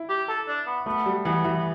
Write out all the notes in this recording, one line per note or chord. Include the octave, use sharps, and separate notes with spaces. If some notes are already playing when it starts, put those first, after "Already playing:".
Already playing: E4
G4
A4
D4
B3
A3 B3
G3
E3 B3
E3
B3